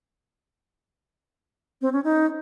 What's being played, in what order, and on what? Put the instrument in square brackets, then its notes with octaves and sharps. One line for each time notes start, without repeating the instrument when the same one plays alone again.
[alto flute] C4
C#4
D#4